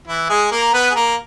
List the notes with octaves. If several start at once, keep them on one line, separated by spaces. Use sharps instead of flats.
E3 E4
G#3 G#4
A#3 A#4
B3 B4
G#4
A#3 A#4